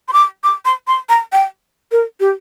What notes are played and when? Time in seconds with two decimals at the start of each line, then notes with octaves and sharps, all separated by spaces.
0.08 C6
0.13 D6
0.44 D6
0.65 C6
0.88 C6
1.09 A#5
1.32 G5
1.92 A#4
2.20 G4